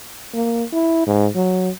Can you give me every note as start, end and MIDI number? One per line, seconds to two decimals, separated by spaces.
0.34 0.64 58
0.73 1.02 64
1.07 1.28 44
1.35 1.70 54